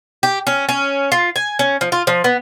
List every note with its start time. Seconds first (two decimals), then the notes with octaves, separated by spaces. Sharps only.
0.23 G4
0.47 C#4
0.69 C#4
1.12 F4
1.36 G#5
1.59 C#4
1.81 F3
1.92 F4
2.07 F3
2.24 B3